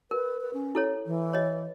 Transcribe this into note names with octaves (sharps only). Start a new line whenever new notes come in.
A#4 B4
B4
C#4
E4 A4 C#5
E3
C#5 D#5